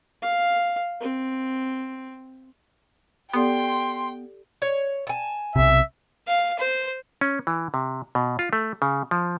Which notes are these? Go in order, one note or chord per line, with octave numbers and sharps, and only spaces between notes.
F5
C4
B3 G4 A4 D5 G5 C6
C#5
G#5 A5
B1 C3 E5
F5
C5
C#4
E3
C3
B2
F4
A3
C#3
F3